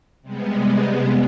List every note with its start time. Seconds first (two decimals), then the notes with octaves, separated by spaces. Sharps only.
0.22 C3 G3 G#3 B3